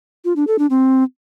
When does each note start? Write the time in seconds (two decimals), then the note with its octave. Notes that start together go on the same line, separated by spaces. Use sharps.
0.25 F4
0.36 D4
0.47 A4
0.59 D4
0.70 C4